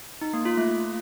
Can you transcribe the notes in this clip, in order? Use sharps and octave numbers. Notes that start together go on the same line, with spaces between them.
D#4
A#3
F4
A3